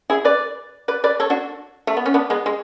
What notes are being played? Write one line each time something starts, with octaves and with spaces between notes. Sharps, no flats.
E4 G#4
B4 D5
B4 D5
B4 D5
A4 C#5
D4 F#4
A3
B3
C#4
B3 D4
G#3 B3
G#3